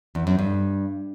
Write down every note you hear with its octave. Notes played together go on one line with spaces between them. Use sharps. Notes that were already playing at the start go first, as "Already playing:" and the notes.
E2
F#2
G2